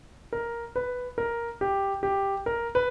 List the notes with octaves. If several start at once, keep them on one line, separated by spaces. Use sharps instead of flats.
A#4
B4
A#4
G4
G4
A#4
B4